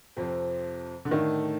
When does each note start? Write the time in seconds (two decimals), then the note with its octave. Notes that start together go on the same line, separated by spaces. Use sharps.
0.17 F2 C3 F3 C4
1.05 D3
1.11 A2 D#3 A3 D4 A4